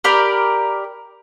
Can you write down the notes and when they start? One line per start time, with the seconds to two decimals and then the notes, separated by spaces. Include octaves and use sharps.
0.04 G4 A#4 D5 B5